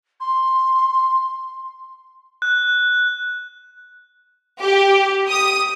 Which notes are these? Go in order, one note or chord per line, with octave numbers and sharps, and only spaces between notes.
C6
F#6
G4
D#6